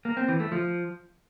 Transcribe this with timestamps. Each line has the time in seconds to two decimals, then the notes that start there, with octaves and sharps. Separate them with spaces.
0.05 A#3
0.17 C4
0.28 E3
0.40 A3
0.52 F3